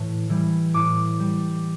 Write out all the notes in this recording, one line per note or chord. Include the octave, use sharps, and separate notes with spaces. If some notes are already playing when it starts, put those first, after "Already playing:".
Already playing: A2 E3
E3 G3
A2 D6
G3